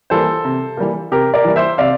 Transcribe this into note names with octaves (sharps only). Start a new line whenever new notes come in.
E3 G3 A#3 A4 C5
C3
E3 G3 A#3
C3 G4 A#4
A#4 D5
E3 G3 A#3
C5 E5
C3 D5 F5